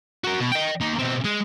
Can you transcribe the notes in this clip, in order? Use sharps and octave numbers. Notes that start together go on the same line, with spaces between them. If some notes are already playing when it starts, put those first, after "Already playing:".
F#4 A#4
B2
D#5 G5
A#3 D#4
B2 C4
G#3